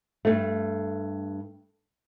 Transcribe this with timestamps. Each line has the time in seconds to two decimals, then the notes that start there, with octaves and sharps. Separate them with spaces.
0.25 G2 A3